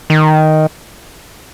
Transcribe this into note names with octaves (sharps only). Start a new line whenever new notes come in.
D#3